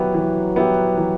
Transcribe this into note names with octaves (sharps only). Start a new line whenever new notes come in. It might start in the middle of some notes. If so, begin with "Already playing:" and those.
Already playing: F#3 B3 E4 G4
E3
B3 E4 G4
E3